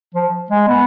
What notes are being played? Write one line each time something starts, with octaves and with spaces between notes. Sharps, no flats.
F3
G#3
B3